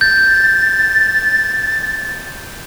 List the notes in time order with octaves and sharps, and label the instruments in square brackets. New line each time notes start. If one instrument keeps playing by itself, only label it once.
[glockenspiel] G6 [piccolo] A6